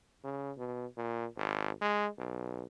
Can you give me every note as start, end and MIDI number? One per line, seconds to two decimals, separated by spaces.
0.24 0.52 49
0.57 0.86 47
0.97 1.26 46
1.37 1.71 32
1.82 2.08 56
2.19 2.66 35